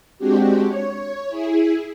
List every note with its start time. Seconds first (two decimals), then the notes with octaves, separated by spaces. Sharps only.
0.19 G#3 C4 D4 F#4 G4
0.64 C#5
1.29 E4 G#4